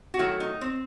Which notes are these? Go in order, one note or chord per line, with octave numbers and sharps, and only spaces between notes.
F#4
D#3 F#3 A3 E4
D#4
C4